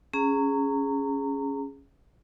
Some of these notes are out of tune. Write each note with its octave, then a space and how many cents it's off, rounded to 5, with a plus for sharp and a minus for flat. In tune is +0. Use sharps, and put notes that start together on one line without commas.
C#4 +0 G#4 +0 A#5 -25